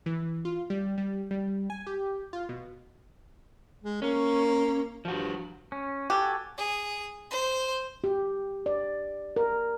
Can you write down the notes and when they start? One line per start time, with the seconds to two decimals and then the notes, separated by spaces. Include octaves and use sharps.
0.06 E3
0.45 F4
0.70 G3
0.98 G3
1.31 G3
1.70 G#5
1.87 G4
2.33 F4
2.49 B2
3.83 G#3
4.02 A#3 C#4
5.05 G2 F3 F#4
5.72 C#4
6.10 F#4 G4 A4 G#5
6.58 G#4
7.31 C5
8.04 G4
8.66 D5
9.36 A#4